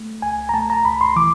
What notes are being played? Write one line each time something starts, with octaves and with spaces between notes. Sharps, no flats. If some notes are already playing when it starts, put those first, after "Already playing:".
Already playing: A3
C#2 G#5
A#5
A3 A5
A#5
C#2 B5
C6
E3 D6